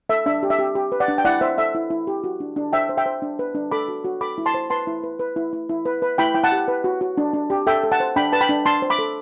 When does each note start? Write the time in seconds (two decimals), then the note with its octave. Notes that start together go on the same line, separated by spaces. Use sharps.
0.09 A4 E5
0.26 D4 E5
0.43 G4
0.50 E5
0.59 G4
0.75 G4
0.92 B4
1.00 D5 F#5
1.08 D4
1.18 G5
1.25 E4 D5 F#5
1.41 C5 E5
1.58 A4 E5
1.75 E4
1.90 E4
2.07 G4
2.24 F#4
2.40 D4
2.56 D4
2.73 C5 E5 G5
2.89 C5
2.97 E5 G5
3.06 C5
3.22 D4
3.39 B4
3.55 D4
3.72 A4 B5 D6
3.88 F#4
4.05 F#4
4.21 A4 B5 D6
4.38 E4
4.46 A5 C6
4.54 C5
4.70 B4 A5 C6
4.87 E4
5.04 B4
5.19 B4
5.36 E4
5.53 E4
5.69 E4
5.86 B4
6.02 B4
6.18 E4 G5 B5
6.34 E4 G5
6.44 F#5 A5
6.52 G4
6.68 B4
6.84 F#4
7.01 F#4
7.17 D4
7.34 D4
7.50 G4
7.67 A4 E5 G5
7.84 A4
7.92 F#5 A5
8.00 C5
8.16 D4 G5 B5
8.32 B4 A5
8.41 G5 B5
8.49 D4
8.66 D4 A5 C6
8.82 C5
8.90 B5 D6
8.99 A4